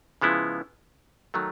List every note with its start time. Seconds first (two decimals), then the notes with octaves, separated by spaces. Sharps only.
0.21 C#3 F3 G#3 B3 E4
1.34 D#3 F#3 A3